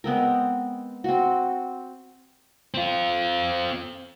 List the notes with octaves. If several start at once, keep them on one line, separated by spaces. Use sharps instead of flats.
G#3 B3 C4 A#4
C4 F#4
C4 F4